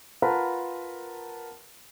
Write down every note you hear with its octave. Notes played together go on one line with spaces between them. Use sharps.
F4 A#4 B4 F#5 A5 B5